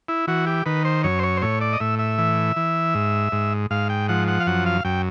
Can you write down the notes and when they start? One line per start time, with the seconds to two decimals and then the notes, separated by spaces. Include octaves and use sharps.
0.08 E4
0.27 E3 F#4
0.47 G4
0.66 D#3 B4
0.85 C5
1.04 F#2 C#5
1.19 C5
1.23 C#5
1.37 C5
1.42 A2 C#5
1.61 D5
1.73 D#5
1.80 A2 E5
1.99 E5
2.18 E3
2.56 E3
2.94 G#2
3.32 G#2
3.71 G#2 F5
3.90 G5
4.09 F3 F#5
4.28 F#5
4.40 F5
4.47 F#2 F#5
4.66 F5
4.85 F#2 G5